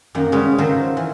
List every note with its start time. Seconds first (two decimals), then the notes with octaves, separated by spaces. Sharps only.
0.15 F#2 D#3 A#3 F#5
0.32 C#3 G3 G#3 B4 C#5
0.58 D#3 F#3 F4 A4 C5
0.97 E3